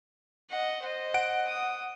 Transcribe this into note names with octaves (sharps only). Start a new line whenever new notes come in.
D#5 F#5
C5 D#5
F#5 D7
D#6